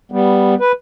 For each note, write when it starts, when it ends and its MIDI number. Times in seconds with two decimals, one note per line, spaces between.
0.12 0.54 55
0.12 0.54 59
0.60 0.72 71